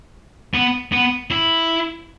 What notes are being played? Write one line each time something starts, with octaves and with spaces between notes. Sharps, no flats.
B3
B3
E4